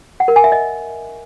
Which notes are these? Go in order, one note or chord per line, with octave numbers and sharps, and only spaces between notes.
F#5
A#4
G#5
E5
D#5